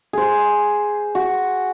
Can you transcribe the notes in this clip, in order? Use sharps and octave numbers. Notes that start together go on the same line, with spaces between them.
G#4 C5
F#4